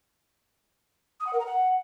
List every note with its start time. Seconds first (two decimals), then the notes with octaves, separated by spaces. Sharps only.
1.20 D#6
1.26 F#5
1.33 A#4
1.39 A#5
1.46 F#5